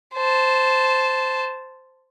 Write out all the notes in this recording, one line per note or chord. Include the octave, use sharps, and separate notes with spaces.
C5 A5